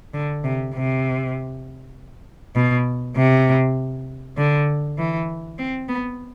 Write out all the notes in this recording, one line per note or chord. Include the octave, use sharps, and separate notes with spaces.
D3
C3
C3
B2
C3
D3
E3
C4
B3